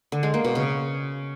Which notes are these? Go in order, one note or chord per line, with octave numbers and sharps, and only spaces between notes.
D3
G#3
A#3
B2
C#3